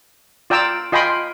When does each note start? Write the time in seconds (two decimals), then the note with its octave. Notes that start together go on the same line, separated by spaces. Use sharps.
0.50 F4 D5 G5 A#5 E6
0.92 F4 D#5 G5 G#5 B5 C6